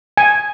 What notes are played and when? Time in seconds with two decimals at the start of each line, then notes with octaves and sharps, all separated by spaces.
0.17 G#5